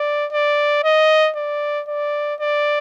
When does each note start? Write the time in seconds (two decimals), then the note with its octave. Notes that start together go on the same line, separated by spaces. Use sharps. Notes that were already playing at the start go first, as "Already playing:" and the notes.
Already playing: D5
0.32 D5
0.84 D#5
1.36 D5
1.88 D5
2.40 D5